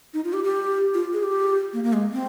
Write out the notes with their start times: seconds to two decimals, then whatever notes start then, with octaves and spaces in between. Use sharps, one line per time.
0.14 D#4
0.24 F4
0.33 G4
0.44 G4
0.94 F4
1.13 G#4
1.23 G4
1.73 A#3
1.84 A#3
1.93 G#3
2.12 C4